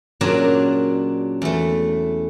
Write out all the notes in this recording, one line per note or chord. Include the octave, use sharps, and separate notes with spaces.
A#2 C#3 F#3 D4 A#4 D5
E2 A3